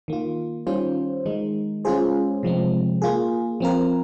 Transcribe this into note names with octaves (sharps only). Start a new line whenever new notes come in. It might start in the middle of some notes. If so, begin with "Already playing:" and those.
D#3 A#3 F4
D#3 G3 C#4 F4 C5
D#3 G#3 D#4
G#3 C#4 F4 G#4 C5
C3 F3 G#3 C4
A#3 F4 G#4
F3 C4 F4 A#4